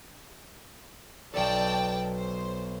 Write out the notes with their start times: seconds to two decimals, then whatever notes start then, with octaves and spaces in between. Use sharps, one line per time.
1.34 B1 A4 D5 G5 A5
2.15 C5